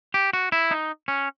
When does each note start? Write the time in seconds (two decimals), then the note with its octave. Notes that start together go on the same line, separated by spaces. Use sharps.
0.14 G4
0.33 F#4
0.52 E4
0.71 D#4
1.08 C#4